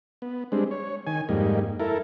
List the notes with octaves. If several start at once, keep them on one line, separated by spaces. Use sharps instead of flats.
B3
G3 G#3 C4 D4
C#5
D#3 G#5
F2 G#2 G3 A#3 D#4
E4 A4 A#4